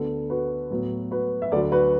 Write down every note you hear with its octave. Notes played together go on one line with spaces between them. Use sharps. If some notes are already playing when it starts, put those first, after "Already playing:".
Already playing: D2 D3 B3 A4
F#4 B4
A2 F#3 B3
F#4 B4
E5
D2 D3 F#3 A4 D5
F#4 B4